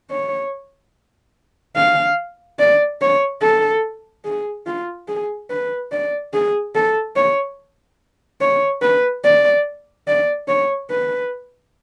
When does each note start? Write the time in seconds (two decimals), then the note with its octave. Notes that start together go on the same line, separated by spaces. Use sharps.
0.10 C#5
1.75 F5
2.59 D5
3.01 C#5
3.42 A4
4.25 G#4
4.66 F4
5.08 G#4
5.50 B4
5.92 D5
6.33 G#4
6.75 A4
7.16 C#5
8.41 C#5
8.82 B4
9.25 D5
10.08 D5
10.48 C#5
10.90 B4